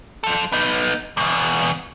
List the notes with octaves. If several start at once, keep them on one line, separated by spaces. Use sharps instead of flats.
F3 A4
B3 D#4
E2 B2